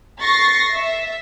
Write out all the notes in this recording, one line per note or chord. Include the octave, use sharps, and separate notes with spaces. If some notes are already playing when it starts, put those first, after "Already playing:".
C#6 A6 A#6 C7
E5